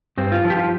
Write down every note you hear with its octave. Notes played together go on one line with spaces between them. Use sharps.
G2 C4
F4
F3
G4
F4